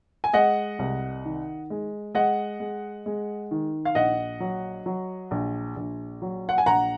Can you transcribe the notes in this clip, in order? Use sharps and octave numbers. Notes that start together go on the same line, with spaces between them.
G#5
G#3 D#5 F#5
C2
D#3
G#3
G#3 D#5 F#5
G#3
G#3
D#3
F5
A#1 D#5 F#5
F#3
F#3
A#1
A#1
F#3
F#5
G#5
A#1 F#5 A#5